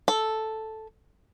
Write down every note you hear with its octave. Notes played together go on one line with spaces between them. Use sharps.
A4